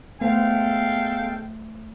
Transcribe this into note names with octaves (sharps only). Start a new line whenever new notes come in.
G#3 A3 B3 A4 C5 F5 G5